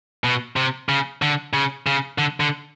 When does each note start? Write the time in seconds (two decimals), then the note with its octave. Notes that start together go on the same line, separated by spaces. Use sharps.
0.24 B2
0.56 C3
0.89 C#3
1.22 D3
1.53 C#3
1.87 C#3
2.18 D3
2.40 D3